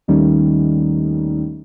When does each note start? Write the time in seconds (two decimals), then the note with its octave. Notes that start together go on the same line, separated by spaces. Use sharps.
0.08 D#2 D#3 G3 A3 C#4 D#4